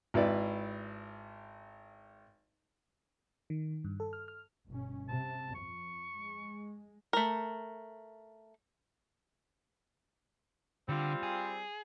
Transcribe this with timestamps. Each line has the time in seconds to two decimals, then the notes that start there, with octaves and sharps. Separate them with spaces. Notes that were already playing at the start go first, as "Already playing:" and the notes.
0.14 G#1 E4 B4 D5
3.50 D#3
3.84 G2
4.00 A4
4.13 F6
4.28 F6
4.68 G1 B2 C#4
5.09 C3 A5
5.55 F2 C#6
6.15 G#3
7.13 A3 A#4
10.89 D3 G3 C4 F4
11.23 G#4